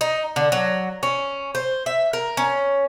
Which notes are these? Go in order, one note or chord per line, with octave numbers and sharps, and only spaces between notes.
D#4
D3
F#3
C#4
C5
E5
A#4
C#4